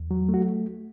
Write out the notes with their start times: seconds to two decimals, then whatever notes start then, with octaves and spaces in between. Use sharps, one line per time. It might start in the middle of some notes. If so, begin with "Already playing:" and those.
Already playing: E2
0.11 F#3
0.29 A3
0.34 F#4